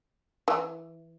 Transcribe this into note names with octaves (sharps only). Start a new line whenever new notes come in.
E3